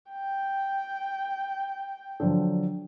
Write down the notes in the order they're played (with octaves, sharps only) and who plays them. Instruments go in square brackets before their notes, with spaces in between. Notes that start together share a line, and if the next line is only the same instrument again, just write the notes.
[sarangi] G5
[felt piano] D3 F3 F#3